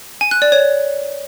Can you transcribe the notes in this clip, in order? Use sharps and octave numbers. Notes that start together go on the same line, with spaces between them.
G#5
F#6
D5
C#5